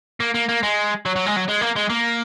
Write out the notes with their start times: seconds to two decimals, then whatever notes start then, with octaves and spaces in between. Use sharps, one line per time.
0.20 A#3
0.34 A#3
0.49 A#3
0.63 G#3
1.06 F#3
1.16 F#3
1.26 G#3
1.36 F#3
1.48 G#3
1.61 A#3
1.76 G#3
1.90 A#3